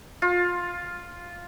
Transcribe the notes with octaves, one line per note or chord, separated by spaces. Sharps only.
F4